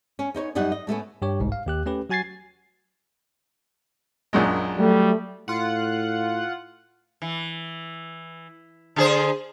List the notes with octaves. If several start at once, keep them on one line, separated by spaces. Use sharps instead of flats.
C#4
B3 D#4 C5 C#5
F#2 G3 D#4 D#5 F#5
D#5
A2 A3 B3 C#4
G2 G4 C#5
G1 C2 G#2
F5
D#2 G4 F#6
A3 C#4 G4 B4
F#3 F#4 G#5 G#6 A6 C7
A#1 F#2 G#3
F#3 G3 A3
A2 F4 F#5
E3
D3 G#4 C5